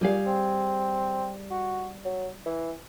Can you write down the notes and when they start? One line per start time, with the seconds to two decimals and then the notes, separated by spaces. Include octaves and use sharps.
0.01 A#2 G3 G#4 F5
0.26 C4
1.51 F#4
2.05 F#3
2.46 E3